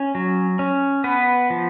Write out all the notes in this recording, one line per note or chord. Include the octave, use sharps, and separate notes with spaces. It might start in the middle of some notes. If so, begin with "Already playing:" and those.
Already playing: C#4
F#3
C#4
B3 B4
F3